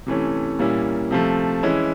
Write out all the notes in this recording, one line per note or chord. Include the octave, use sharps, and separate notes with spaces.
C3 E3 A3 C#4
A#2 G3 A#3 C#4 E4
C3 F3 A3
E3 G#3 C#4 E4